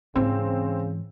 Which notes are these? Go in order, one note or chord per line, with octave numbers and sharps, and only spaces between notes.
G#2 C#3 E3 C4